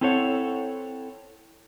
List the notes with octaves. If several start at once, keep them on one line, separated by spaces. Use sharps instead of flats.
C4 E4 A4 C5 C#5 F#5